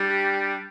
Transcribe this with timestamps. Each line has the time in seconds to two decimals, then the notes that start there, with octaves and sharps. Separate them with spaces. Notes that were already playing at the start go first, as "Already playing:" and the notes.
Already playing: G3 D4 G4